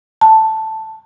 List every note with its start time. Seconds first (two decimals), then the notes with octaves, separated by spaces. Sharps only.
0.21 A5